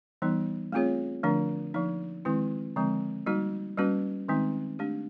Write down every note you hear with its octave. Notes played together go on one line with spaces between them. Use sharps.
E3 G3 B3 D#4
A3 C4 F4 G#4 C#5
D3 F3 A3 D4
F3 A#3 D#4
D#3 G#3 C4 E4
D3 F3 G#3 C4
G3 A#3 D#4 F#4
G3 A#3 C#4 F#4 B4
D#3 G#3 C4 D#4
A3 D4 G4